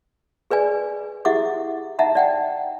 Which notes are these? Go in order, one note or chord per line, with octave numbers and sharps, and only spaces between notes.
G#4 B4 D5 G#5
E4 G4 G#4 E5 F#5 D6
D#4 E5 F#5 A5 A#5
D5 F#5 G5